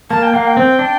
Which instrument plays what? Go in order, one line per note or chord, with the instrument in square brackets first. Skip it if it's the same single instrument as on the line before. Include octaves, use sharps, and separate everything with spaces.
[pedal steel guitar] A#3 [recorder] A5
[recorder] G5
[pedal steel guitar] A#3 [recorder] F5
[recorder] G5
[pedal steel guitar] C4
D4